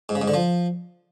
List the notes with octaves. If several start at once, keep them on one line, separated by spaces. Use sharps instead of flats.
G#2
C#3
G#2
D3
F3